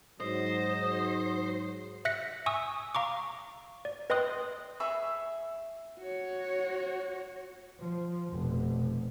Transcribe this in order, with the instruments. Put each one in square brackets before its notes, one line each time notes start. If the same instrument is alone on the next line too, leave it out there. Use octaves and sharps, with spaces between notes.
[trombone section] G#2 F#3 [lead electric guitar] C5 [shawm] D#5
[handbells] E5 F#6 A#6 B6 C#7
G#5 C#6 D#6 E6
F5 A#5 C#6 D6
D5
B4 D#5 G5 C6 D#6 F#6
[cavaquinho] G#4 E5 B5 C#6
[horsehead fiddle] F#4 C#5
[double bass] F3
F1 B2